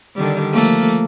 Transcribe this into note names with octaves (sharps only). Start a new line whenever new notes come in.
D3 D#3 G3
F3 A3 A#3